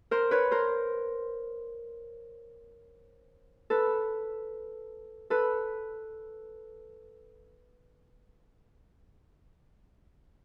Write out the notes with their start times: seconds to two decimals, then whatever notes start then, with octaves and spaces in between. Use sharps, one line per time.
0.11 A#4 C5
0.31 B4 C#5
0.51 A#4 C5
3.70 A4 B4
5.30 A4 B4